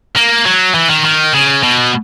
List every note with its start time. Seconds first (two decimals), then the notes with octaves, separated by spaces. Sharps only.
0.16 A#3
0.45 F#3
0.75 E3
0.90 D#3
1.05 D#3
1.34 C#3
1.64 B2